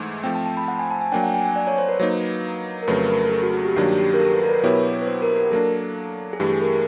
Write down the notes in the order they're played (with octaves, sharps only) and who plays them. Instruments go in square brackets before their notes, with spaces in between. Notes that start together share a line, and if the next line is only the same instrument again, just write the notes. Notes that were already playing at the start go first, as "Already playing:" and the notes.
Already playing: [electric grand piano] G#2 E3 A3
[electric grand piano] F3 A3 C4 [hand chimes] G5
[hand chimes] A5
A5
B5
F#5
G#5
A5
G#5
[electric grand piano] F#3 A#3 D4 [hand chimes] G5
[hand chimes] F#5
G#5
G#5
D5
C#5
C5
B4
[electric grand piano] F#3 A#3 D#4
[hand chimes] A#4
[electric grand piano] F2 C#3 F#3 A3 [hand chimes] B4
[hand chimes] A#4
A4
G#4
F#4
F#4
G4
[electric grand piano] G2 D#3 F#3 A#3 D4 [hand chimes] G4
[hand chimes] G4
A#4
A4
B4
A#4
B4
[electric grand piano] B2 F#3 B3 E4 G4 [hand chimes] C#5
[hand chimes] B4
C5
A#4
A#4
[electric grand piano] F#3 A#3 D4 [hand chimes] A4
[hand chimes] G#4
[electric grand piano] G2 E3 A3 [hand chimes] G4
[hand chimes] G#4
A#4
A#4